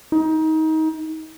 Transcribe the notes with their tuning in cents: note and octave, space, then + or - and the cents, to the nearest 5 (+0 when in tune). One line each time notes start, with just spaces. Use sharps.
D#4 +25